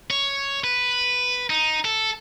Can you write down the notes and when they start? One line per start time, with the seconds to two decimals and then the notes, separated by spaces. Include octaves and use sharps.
0.10 C#5
0.64 B4
1.50 D#4
1.85 A4